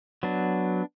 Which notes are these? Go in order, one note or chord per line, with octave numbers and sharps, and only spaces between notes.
F#3 B3 D4